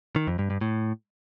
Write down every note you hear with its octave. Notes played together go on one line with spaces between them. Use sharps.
D#3
F2
G2
G2
A2